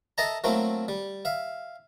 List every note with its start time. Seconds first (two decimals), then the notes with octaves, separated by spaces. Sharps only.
0.18 A4 D#5 E5 A5 A#5
0.44 F#3 A3 A#3 C4 E4
0.88 G3
1.25 E5 F5